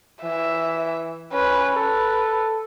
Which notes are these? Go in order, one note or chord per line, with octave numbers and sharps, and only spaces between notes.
E3 E5
C#4 B4
A4 B4